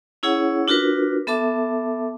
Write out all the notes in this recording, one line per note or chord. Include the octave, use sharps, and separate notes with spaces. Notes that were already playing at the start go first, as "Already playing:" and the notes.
C#4 E4 G#4 C#5 F#5
D4 F4 F#4 A#4 B4
B3 A4 E5 A5 D6